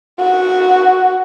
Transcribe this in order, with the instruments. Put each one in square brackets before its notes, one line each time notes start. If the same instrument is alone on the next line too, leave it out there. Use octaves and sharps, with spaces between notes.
[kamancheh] F#4